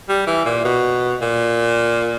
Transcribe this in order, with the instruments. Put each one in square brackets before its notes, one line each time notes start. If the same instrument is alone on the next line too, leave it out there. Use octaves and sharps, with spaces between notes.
[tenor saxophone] G3
E3
A#2
B2
A#2